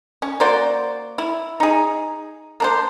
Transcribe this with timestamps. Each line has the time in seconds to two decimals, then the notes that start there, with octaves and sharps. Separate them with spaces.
0.22 C#4
0.40 A#3 F#4 C5 D5
1.18 E4
1.60 D#4 G#4
2.60 A#3 D4 C5